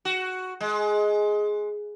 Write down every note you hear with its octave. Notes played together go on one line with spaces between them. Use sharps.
F#4
G#3